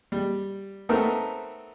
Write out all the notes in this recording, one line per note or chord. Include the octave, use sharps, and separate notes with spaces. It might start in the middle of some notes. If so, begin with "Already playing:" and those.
G3
A3 B3 C4 D#4 A4 A#4